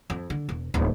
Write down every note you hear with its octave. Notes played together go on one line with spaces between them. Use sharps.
F2
D3
E1
D1